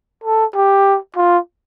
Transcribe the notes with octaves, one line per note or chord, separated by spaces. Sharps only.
A4
G4
F4